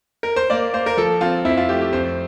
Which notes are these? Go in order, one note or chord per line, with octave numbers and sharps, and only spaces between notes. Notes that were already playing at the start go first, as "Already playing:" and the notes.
A#4
C5
A#3 D5
A#3 C5
A#4
F3 A4
C4 F4
F2 E4
F4
A3 G4
G4
F2 C5